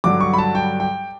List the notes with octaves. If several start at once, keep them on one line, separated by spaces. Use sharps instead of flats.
G2 D3 F#3 D6
C#6
B5
A5
G5
G5